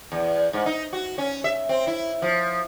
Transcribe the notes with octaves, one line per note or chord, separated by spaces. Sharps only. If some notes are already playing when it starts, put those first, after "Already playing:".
E2
G#2
D#4
F#4
C#4
E5
C4
E4
F3